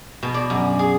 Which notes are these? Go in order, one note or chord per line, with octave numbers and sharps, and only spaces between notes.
B2
D5
F#2
G#4